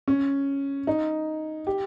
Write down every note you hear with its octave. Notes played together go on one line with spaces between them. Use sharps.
C#4
D#4
G4